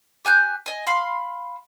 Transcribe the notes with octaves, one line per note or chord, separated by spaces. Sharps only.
G4 G#5 F#6 G6
D#5 G#5
F5 B5 C6